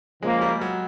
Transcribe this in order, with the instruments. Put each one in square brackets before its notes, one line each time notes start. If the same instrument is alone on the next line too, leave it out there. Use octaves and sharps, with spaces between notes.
[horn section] C#3 F3 A#3 [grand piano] G#3
[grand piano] G3
F#3